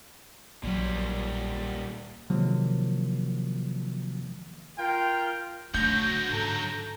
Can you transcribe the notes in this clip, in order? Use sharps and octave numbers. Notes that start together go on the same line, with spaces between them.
A#1 A#2 F#3 G3
C3 D#3 F3 F#3 G#3 A#3
F4 A#4 F5 G5
D3 F#3 A3 D4 F#4 G6 A#6
G#2 A4 A5 A#5